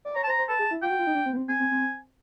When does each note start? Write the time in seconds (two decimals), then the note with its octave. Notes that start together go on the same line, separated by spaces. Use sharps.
0.05 D5
0.15 C#5 A#5
0.23 A5
0.27 C5
0.30 A#5
0.38 C5
0.49 B4 A5
0.59 G#4
0.71 E4
0.82 F4 G5
0.90 F#4
0.99 F4
1.07 D#4
1.15 D4
1.26 C4
1.33 B3
1.37 C4
1.48 C4 G#5
1.60 C4
1.71 C4